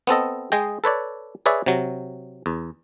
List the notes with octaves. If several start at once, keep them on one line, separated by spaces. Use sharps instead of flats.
B3 C4 A4 D#5
G#3 G#4 D#5 G5
A4 B4 C#5 D5
G#4 B4 C#5 D5 E5
C3 F#3
E2